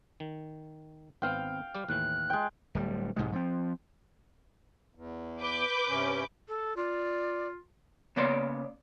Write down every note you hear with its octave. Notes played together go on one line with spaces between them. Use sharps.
D#3
G#1 B3 C4 F5 G5
G3 G4 D5
D#2 A2 E3 F#6
G#3 G5
D1 G3
B1 G#2 C3 G#3
F3 C4
E2
B4 D6 G6
G2 C3 C#4
A4
F4 D5
C#3 A#3 B3 C#5 D5 C6